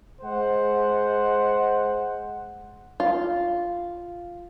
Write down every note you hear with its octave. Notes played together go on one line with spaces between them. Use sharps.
G#3 C5 F#5
F4